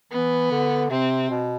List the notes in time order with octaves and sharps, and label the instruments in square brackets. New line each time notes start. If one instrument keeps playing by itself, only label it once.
[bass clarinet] E3 [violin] B3
[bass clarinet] D3
[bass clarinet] C3 [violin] C4
[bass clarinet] B2